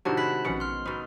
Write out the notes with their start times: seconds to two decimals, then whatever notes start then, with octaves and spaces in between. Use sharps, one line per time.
0.05 A2 C3 D#3 D4 D#4 F#4 F#5 A5
0.17 G#3 B5 F#6 B6
0.45 A#1 B2 C#4 F#5 C#7
0.60 C6 F6
0.86 B2 D#4 B5 E6